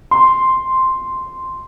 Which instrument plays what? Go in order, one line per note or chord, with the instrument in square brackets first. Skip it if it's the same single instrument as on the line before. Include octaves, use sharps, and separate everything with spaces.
[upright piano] C6